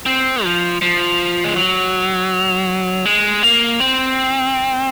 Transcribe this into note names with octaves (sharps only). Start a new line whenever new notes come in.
C4
F3
F3
G#3
F#3
G#3
A#3
C4